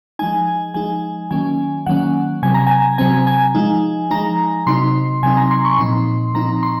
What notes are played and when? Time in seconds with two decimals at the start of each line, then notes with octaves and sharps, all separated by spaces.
0.19 F3 G#3 D#4 G#5
0.74 F3 G#3 D#4 G#5
1.31 D#3 F#3 A#3 C#4 G#5
1.86 D#3 F#3 A#3 C#4 F#5
2.43 C3 F#3 C4 G#5
2.54 A#5
2.67 G#5
2.98 C3 F#3 C4 G#5
3.27 G#5
3.55 F3 G#3 D#4
4.11 F3 G#3 D#4 A#5
4.67 C3 F#3 C4 D#4 C6
5.23 C3 F#3 C4 D#4 G#5
5.37 A#5
5.51 C6
5.65 C#6
5.78 A#2 F3 C4 D#4 C6
6.34 A#2 F3 C4 D#4 A#5
6.63 C6